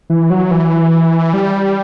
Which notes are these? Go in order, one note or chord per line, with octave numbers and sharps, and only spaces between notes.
E3
F#3
E3
G3